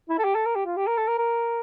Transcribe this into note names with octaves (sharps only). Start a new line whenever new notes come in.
E4
A4
G4
A4
A#4
G4
F4
G4
A#4
A4
A#4
A#4